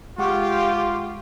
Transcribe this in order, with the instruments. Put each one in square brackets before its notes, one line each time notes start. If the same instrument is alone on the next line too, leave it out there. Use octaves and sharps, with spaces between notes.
[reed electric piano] G#3 F#5 C#6 [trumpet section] F4 [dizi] G4